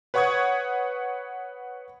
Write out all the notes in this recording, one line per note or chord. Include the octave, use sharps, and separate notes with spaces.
B4 C#5 F#5 C#6 D#6 G#6